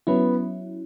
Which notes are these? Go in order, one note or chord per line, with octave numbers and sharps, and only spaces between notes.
F#3 B3 C#4 E4